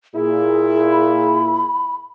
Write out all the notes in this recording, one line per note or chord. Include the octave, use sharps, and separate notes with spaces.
A#2 E4 G#4
B5